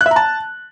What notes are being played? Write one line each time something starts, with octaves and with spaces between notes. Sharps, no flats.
F#6
E5
A#5
A5